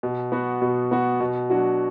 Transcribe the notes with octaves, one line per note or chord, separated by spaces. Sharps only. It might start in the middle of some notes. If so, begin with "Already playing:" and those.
B2
B3 F#4
B2
B3 F#4
B2
F#3 D4 F#4